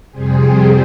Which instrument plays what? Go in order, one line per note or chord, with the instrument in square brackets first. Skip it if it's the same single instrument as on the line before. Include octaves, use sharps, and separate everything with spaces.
[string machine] F2 C3 G3 C4 G#4